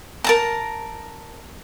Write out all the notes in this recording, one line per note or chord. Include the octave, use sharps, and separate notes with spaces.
A#4 A5 A#5